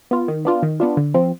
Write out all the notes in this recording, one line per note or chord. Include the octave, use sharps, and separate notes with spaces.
B3 F4
D#3
B3 D4 F4
D#3
B3 D4 F4
D3
F3 C4